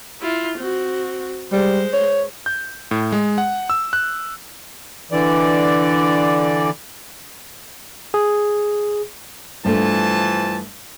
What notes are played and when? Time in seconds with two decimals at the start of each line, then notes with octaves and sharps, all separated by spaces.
0.22 E4 F4
0.58 C4 F#4
1.52 G3 G#3 C5
1.93 C#5
2.46 G6
2.91 A2
3.12 G#3
3.38 F#5
3.70 E6
3.93 F#6
5.11 D3 E3 D5
8.14 G#4
9.65 G2 E3 F3 A3 A5